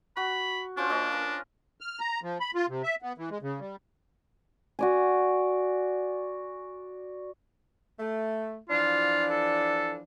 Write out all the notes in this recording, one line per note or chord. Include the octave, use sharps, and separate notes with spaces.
F#4 B5
C#4 D4 F4 C5
A#3 C#4 D#5
A#4 B4
F6
A#5
F3
B5
F4
C3
E5
B3
E3
G#3
C#3
G3
F#4 D5 G#5
A3
E3 F3 D4 F4
A4